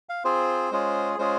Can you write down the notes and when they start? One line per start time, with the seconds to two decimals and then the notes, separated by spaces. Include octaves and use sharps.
0.09 F5
0.24 C4 F4 G#4 C5
0.72 G#3 C#4 F4 G#4
1.19 G#3 C#4 F4 G#4 C5